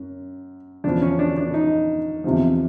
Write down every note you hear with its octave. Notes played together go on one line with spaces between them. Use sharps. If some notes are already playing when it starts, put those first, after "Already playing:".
Already playing: F#2
E2 C#3 F3 D4
C#4
D4
D4
D#4
E2 C3 F3